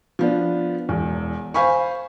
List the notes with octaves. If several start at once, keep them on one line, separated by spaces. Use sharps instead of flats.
F3 B3 D4
E1 E2
C5 F5 G#5 B5 C#6